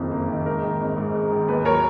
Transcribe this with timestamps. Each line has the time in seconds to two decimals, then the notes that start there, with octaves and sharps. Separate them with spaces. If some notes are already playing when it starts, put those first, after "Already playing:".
Already playing: F#1 F2 D#3 A#3
0.11 A#3
0.28 D#3
0.45 G#3 A#4
0.63 D#3
0.80 G#1
0.97 G#2
1.14 G#3
1.32 D#3
1.48 D#2 B4
1.65 F#3 A#4 C#5